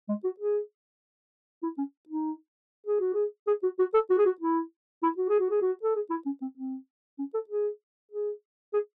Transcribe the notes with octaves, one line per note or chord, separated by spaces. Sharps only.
G#3
F#4
G#4
E4
C#4
D#4
G#4
F#4
G#4
G#4
F#4
F#4
A4
F#4
G#4
F#4
E4
E4
F#4
G#4
F#4
G#4
F#4
A4
G#4
E4
C#4
C4
C4
C#4
A4
G#4
G#4
G#4